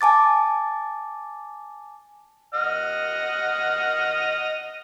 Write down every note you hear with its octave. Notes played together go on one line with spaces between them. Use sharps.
G#5 A5 D6 A6
D#5 F#5 F6